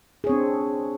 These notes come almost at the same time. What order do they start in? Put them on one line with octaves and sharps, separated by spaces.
G#4 C#5 C4 D4